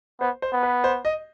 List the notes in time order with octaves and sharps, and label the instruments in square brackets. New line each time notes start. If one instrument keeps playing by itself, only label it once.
[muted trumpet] B3 [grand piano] C5
[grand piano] C5
[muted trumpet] B3
[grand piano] B4
C5
D#5